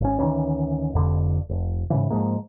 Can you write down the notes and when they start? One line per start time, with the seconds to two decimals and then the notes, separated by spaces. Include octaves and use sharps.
0.01 G#1 C#4
0.19 D2 D#3 E3 C#4
0.94 F1 F2 D3
1.49 F1
1.90 G#2 C#3 E3
2.10 G#2 F3 G#3 A#3